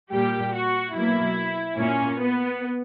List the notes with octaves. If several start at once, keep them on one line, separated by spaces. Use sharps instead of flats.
A#2 G3 A#3 G4
F#4
B2 F#3 A#3 E4
A#2 A#3 C#4
B3